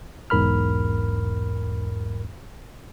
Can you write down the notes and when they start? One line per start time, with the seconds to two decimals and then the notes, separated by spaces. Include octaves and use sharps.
0.30 B1 E2 G#2 A#4 B5 F6